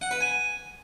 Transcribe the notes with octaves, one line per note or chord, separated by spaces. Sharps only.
F#5
B4
G#5